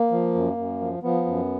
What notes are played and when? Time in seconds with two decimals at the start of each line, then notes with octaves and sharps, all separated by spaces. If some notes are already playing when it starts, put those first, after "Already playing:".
Already playing: A#3
0.11 F3
0.35 F#2
0.57 F#2
0.81 F3
1.03 F3 B3
1.26 F#2